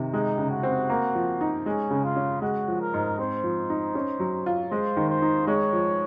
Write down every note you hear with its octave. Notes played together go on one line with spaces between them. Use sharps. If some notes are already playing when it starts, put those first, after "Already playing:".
Already playing: C3 D#3
G#3 D#4
C#3
F#4
C4
A#3
F3
D#4
G#3 C#4
C#3
F4
C#4
G#3 F#4
F3
A#4
G#2
C4 C5
F3
D#4
C#4
F#3
F4
G#3 C5
D#3
C5
D#4
G#3 C#5
F3